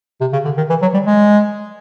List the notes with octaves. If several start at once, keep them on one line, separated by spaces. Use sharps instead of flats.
C3
C#3
D3
D#3
E3
F#3
G3
G#3